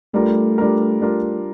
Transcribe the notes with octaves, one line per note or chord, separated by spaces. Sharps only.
G3 A3 D4 F4 A#4
G3 D4 F4 A#4
G3 D4 F4 A#4